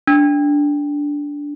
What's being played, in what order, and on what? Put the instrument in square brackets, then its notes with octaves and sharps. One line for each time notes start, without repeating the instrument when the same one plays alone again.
[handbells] D4